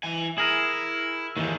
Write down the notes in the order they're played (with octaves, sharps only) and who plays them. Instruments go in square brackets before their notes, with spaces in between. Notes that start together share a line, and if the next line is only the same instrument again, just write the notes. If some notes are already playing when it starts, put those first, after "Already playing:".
[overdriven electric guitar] E3 G#5
[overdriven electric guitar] E4 [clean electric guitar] G#4 A#4 G#5
[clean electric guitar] D#2 E3 [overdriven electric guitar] G#2 D#3